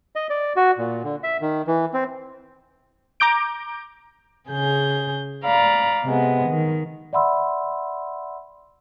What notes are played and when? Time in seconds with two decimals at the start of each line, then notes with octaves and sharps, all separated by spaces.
0.16 D#5
0.30 D5
0.56 F#4
0.78 A#2
1.04 D3
1.23 E5
1.41 D#3
1.67 E3
1.94 C4
3.20 A#5 D6 G6 D7
4.49 C#3 G#4 G6
5.43 D5 F5 A#5 B5
6.04 C3 G#3 B3
6.50 D#3
7.13 D5 E5 F#5 B5 C6 E6